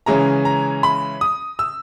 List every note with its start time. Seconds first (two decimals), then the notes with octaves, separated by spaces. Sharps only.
0.06 C#3 E3 G#3 C#4 A#5
0.45 A#5
0.83 B5
1.21 D#6
1.59 E6